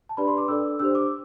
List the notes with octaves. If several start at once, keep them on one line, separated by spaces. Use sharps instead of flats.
A5
D4 G4 B4 D5 B5
C6
D6
D4 A4 D5 E6
D4 G4 C5 E6
D6